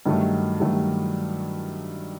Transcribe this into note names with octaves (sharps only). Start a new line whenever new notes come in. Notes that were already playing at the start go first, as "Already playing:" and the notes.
G2 D#3 F#3 A3
G2 D#3 F#3 A3